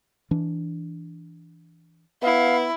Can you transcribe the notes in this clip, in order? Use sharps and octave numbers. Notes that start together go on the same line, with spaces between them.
E3 D4
B3 E4 F5